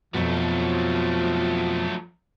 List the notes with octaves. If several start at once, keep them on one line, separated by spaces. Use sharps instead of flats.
F2 B2 F3 F#3 A3